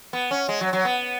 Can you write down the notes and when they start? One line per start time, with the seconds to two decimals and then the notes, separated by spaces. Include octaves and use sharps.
0.13 B3
0.31 C#4
0.49 G#3
0.61 F#3
0.73 F#3
0.85 B3